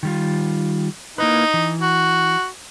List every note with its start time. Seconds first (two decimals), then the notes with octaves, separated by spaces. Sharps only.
0.03 D#3 G3 F4
1.18 A#3 D#4 E4 B4
1.54 E3
1.81 F#4